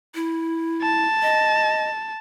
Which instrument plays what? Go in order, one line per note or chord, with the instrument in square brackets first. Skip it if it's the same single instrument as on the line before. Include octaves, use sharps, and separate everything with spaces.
[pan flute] E4
[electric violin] A5
[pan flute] D#5